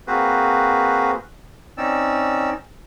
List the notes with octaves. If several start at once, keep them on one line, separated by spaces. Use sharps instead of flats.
A#3 C4 F#4 G#4 B4 C5
C4 C#4 D#4 D5 E6